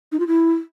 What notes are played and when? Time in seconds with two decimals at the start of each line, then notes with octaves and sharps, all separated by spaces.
0.12 D#4
0.19 F4
0.27 E4